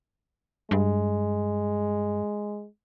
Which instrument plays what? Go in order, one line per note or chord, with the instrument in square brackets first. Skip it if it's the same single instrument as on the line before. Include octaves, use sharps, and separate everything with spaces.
[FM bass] G2 [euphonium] G#3